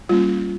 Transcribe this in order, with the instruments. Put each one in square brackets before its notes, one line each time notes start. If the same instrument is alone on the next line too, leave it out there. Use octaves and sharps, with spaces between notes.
[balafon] G3 A#3 C#4 F4